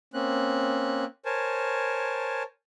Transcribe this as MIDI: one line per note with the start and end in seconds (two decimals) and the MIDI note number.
0.14 1.05 58
0.14 1.05 60
0.14 1.05 61
0.14 1.05 90
1.25 2.43 70
1.25 2.43 72
1.25 2.43 73
1.25 2.43 80
1.25 2.43 81